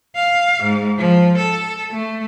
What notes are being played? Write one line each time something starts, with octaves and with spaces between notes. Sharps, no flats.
F5
G#2
F3
A4
A3